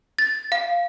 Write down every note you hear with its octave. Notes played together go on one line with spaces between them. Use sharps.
A6
F5